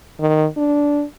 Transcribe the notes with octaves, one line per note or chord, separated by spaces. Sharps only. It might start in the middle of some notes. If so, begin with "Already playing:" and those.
D#3
D4